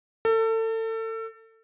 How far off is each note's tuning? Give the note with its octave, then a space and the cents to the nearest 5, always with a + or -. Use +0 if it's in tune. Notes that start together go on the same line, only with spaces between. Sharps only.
A4 +30